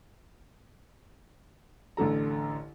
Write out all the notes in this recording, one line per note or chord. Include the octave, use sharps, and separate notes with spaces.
A1 D3 A4 A#5